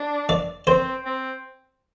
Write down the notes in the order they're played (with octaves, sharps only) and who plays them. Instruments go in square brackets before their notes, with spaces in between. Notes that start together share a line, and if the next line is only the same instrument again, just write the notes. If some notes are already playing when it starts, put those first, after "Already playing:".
Already playing: [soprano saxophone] D4
[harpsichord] D5
[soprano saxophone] C4 [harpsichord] C5
[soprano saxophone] C4